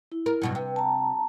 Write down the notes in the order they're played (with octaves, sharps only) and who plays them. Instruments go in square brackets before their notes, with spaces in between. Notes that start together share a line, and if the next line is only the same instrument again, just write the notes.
[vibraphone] E4
[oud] A#4
G2 B2 F#3
[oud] C3 [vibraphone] B4
[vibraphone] A5 A#5